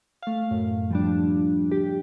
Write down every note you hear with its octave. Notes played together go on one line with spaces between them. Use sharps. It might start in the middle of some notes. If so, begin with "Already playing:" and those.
A3 F5
F#2 A2
F3 G3 D4
C#2 G4